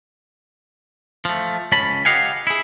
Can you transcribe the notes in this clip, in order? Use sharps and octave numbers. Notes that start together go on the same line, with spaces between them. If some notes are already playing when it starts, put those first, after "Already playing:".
F3 A3
C#2 C#4 A5 B5
G4 D#5 F5 F#5 G#5
E4 G#4